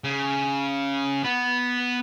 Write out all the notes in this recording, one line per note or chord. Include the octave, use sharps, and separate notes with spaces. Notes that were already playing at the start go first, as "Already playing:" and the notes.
C#3
B3